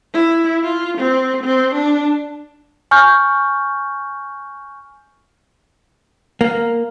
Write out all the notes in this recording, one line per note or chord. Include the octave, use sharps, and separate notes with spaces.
E4
F4
C4
C4
D4
G#5 C#6 F6 G6
A#3